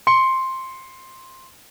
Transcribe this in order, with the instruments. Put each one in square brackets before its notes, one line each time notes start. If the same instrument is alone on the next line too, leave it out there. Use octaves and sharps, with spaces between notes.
[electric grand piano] C6 C#7